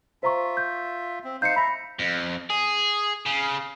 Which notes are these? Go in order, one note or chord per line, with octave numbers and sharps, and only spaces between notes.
F4 C5 E5 A#5 C#6
G6
C4
D#4 C5 F5 G6 C#7
E5 A#5 B5 A#6
F2
G#4
C#3